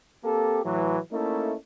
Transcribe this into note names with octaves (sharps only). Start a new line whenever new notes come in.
A#3 C4 G4 A4
A2 E3 F#3
A3 A#3 C#4 D#4 E4 A4